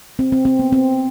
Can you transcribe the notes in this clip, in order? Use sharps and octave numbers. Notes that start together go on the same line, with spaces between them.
C4
C4
C4
B3
C4